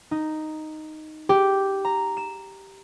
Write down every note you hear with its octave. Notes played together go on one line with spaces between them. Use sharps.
D#4
G4
A#5
E7